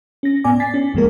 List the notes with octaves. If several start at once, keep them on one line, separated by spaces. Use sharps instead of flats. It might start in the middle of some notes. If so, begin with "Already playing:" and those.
C#4 A#6
A2 B3 D5 G#5 D6
G#5 A6 B6 C7
C#4
C2 G2 F3 G#3 A#3 A#4